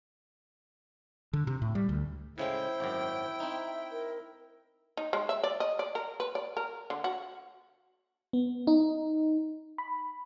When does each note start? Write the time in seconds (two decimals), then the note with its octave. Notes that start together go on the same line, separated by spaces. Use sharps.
1.33 D3
1.47 C3
1.62 A2
1.75 G3
1.89 D2
2.38 A2 C#3 G#3 E4 C5 G5
2.80 G#1 F#2
3.40 C4 D#4 E5
3.91 A#4
4.97 D#4
5.13 G#3
5.29 E5
5.44 D5
5.60 D#5
5.79 D5
5.95 A#4
6.20 B4
6.35 D5
6.57 A#4
6.90 D3
7.04 F#4
8.33 B3
8.67 D#4
9.78 B5